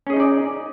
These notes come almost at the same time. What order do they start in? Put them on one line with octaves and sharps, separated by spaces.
C#4 G#4 D#5 D#4 D5